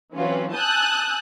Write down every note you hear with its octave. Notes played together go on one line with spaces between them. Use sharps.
E3 F#3 C4 C#4 F4 B4
G#5 A5 D#6 E6 F#6 G6